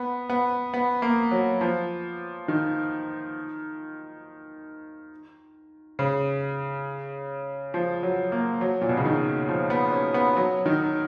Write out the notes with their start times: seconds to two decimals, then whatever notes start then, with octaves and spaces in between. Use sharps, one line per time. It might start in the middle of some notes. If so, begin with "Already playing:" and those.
Already playing: B3
0.30 B3
0.74 B3
1.02 A#3
1.31 F#3
1.61 F3
2.48 D#3
5.99 C#3
7.74 F3
8.03 F#3
8.32 A#3
8.61 F#3
8.81 A#2
8.89 B2
8.97 C#3
9.05 D#3
9.49 F3
9.70 B3
9.92 C#4
10.14 B3
10.37 F#3
10.66 D#3